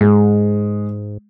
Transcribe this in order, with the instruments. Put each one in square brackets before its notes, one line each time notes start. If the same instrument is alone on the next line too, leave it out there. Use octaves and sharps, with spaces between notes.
[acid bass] G#2 [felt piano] G#3